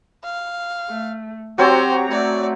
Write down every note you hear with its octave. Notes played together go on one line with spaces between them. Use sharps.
F5
A3
F#3 C4 G4 C5 C#5 A#5
A3 D5